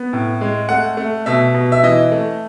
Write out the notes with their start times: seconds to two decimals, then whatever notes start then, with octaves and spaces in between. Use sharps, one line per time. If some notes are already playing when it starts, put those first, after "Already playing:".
Already playing: B3
0.13 A2
0.41 G#3
0.69 A3 F#5
0.97 A3
1.26 B2 E5
1.54 B2
1.72 E5
1.83 E3 D#5
2.12 A3